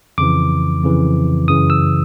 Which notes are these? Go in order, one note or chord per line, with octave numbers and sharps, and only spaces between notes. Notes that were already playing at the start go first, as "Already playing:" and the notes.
F2 C#3 E3 D6
F2 C#3 E3
F#2 C#3 E3 D#6
E6